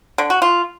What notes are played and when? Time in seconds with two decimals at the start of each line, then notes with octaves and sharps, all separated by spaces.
0.18 D3
0.30 F#4
0.42 F4